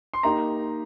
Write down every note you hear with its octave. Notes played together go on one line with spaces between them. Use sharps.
C6
A#3 D#4 G4 A#5